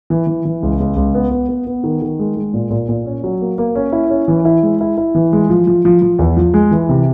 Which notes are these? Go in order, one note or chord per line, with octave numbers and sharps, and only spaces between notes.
E3
E3
E3
C#2
C#2
C#2
B3
B3
B3
B3
D#3
D#3
G#3
G#3
A#2
A#2
A#2
C#4
F#3
A#3
A#3
C#4
E4
C#4
E3
E4
G#3
E4
E4
E3
G#3
F3
F3
F3
F3
E2
F3
G#3
E3
C3